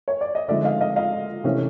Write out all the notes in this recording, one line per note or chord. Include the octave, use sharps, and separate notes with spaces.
C#5
D5
D#5
D3 F3 G#3 C4 D#4 D5 E5
D#5 F5
D#5 F5
D#5 F5
C3 E3 A3 C#4